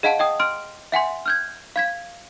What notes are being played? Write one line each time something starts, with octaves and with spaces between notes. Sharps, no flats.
G#4 D#5 F5 F#5 A5
D#5 G5 D#6
C6 F6 D7
E5 F#5 G#5 C6
F6 G6 G#6
F5 G#6 B6